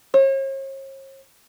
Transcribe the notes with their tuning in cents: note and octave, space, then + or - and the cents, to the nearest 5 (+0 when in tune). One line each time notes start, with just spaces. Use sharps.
C#5 -45